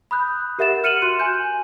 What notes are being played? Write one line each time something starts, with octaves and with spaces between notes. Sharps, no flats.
B5 D#6 F#6 G6
G4 A#4 E5 F#5 A6 E7
F6 C#7 D#7 E7 F#7
F#4 C6 F#6 D#7
G#5 G6